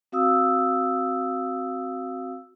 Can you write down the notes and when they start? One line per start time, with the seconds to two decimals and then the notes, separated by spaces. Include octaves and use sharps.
0.12 C4 F#4 F5 D#6 E6